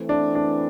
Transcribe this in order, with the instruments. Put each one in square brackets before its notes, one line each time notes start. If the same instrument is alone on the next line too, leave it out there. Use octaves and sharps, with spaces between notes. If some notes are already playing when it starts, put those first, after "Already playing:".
Already playing: [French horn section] E3 A3 C4
[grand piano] D4
D4